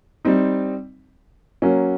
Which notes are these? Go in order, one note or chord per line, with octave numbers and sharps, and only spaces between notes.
G3 C4 D#4
F#3 A#3 C#4